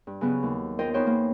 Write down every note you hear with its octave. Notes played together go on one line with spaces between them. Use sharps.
G2
C#3 F#3 B3
D#2
F4 A#4 C5 D#5 G5
E2 B3 D#4 C5 C#5 G5
A#3